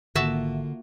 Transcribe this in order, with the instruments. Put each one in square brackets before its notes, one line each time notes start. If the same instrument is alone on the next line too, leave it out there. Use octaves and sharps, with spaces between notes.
[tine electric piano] G#1 [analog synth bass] D3 [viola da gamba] A#3 F4 [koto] F#4 E5 A5